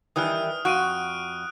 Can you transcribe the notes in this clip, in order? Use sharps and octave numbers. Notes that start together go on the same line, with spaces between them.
D#3 E3 G3 D#6 F6
F2 F#4 F#6 D7 D#7